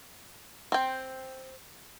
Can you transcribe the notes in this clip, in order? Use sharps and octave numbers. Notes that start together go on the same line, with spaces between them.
C4 G5